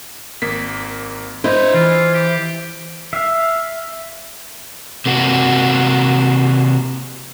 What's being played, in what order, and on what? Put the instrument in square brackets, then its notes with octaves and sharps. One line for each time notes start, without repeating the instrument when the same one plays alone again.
[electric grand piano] G#1 A#3 B6
[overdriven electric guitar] D4 D#5 [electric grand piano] E4 [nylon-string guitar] C5
[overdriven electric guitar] E3 [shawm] F4
[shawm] G4
[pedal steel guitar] E5 F5
[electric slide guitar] C3 A#3 F#4